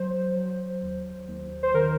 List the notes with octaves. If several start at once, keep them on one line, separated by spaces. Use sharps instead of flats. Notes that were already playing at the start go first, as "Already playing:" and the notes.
Already playing: F#3 C5
F#3
D#2
D#2
C5
D#3 A#4